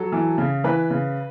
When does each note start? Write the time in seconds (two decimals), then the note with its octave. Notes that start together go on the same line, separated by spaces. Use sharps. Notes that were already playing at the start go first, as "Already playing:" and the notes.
Already playing: F#3 A4
0.12 E3
0.38 C#3
0.64 E3 B4
0.90 C#3